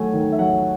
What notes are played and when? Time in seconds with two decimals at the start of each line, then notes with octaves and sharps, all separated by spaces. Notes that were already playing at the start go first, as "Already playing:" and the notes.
Already playing: D#3 F#3 A3 F#5 G#5
0.13 D#3
0.32 E5
0.39 F#3 F#5